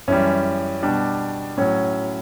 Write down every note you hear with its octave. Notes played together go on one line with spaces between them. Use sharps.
F#2 E3 G3 C#4
B2 G3 D4
A2 F#3 C#4